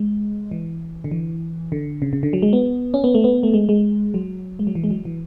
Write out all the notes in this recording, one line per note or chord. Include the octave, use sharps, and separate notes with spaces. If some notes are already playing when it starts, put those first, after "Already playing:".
Already playing: G#3
E3
D3
E3
D3
C#3
C#3
D3
F#3
G#3
B3
C#4
B3
A3
B3
A3
G#3
G#3
F#3
G#3
F#3
E3
G#3
F#3
E3